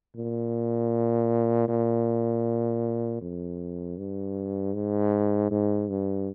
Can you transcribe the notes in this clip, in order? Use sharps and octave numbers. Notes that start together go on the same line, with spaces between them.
A#2
A#2
F2
G2
G#2
G#2
G2